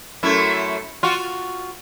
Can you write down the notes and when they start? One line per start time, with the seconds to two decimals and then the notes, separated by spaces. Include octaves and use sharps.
0.23 F#2 A3 E4
1.03 F4 F#4